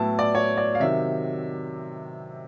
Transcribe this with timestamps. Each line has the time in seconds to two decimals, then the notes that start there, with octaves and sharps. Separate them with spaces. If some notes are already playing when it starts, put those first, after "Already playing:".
Already playing: A2 F#3 B3 E4 A5
0.19 D5
0.35 C#5
0.57 D5
0.75 F5
0.80 C3 D#3 F#3 E5